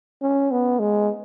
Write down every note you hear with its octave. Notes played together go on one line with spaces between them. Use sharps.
C#4
B3
G#3